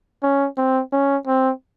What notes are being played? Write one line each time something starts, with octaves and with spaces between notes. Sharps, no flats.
C#4
C4
C#4
C4